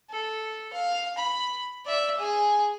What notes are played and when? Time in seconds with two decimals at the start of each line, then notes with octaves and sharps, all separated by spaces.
0.10 A4
0.73 F5
1.18 B5
1.85 D5 E5
2.17 G#4 G#5